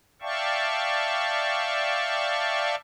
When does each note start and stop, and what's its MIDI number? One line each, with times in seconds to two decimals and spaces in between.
0.21 2.75 74
0.21 2.75 76
0.21 2.75 77
0.21 2.75 79
0.21 2.75 81
0.21 2.75 85